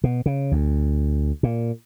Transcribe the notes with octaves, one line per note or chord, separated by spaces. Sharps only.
B2
C#3
D2
A#2